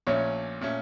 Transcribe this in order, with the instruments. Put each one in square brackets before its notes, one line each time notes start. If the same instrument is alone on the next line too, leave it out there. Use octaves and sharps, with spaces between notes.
[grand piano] A#1 A#2 A3 C#4 [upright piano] C#5
[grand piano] A#2 A3 C#4